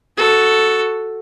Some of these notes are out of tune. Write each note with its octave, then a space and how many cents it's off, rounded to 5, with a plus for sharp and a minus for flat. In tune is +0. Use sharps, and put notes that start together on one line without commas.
F#4 +0 A4 +0